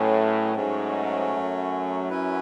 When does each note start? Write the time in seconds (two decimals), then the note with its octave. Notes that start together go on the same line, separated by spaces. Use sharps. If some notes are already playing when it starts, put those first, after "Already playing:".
Already playing: A2 F#3 C#4 G#4 B4
0.55 G#2 F#3 A3 C#4
1.32 F#2
2.10 C#4 E4 B4